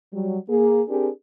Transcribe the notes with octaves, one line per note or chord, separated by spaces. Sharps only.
F#3 G3
A#3 G#4
C4 D4 G4 G#4 A#4